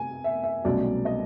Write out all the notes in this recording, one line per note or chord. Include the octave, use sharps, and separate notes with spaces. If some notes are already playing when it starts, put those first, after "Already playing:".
Already playing: C3 G#5
E5
E5
C2 B2 F#3 A3 C#4 D5
D#5